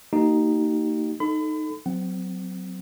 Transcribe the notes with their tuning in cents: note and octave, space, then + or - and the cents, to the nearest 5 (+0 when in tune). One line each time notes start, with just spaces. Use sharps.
A#3 -30 D#4 +0 G4 -40
D#4 -5 A4 +0 B5 +40
F#3 +0 C4 -30 F#5 +30